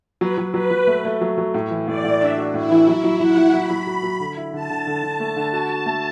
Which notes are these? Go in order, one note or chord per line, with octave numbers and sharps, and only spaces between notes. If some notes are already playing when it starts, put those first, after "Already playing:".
F#3 B4
F#3
F#3 B4
F#3
A3
A3
F#3
F#3
A2
E3
A2 D5
A2
D4 E5
F#4
A2 E4
E3
F#3 E4
F#3
F#3 F#5
F#3
F#3 B5
F#3
F#4
F#3
D3
E4
D3 A5
D3
D3
D3
A3
D3
F#4
F#4
A3